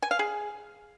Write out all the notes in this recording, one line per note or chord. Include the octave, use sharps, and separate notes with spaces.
G#5
F5
G#4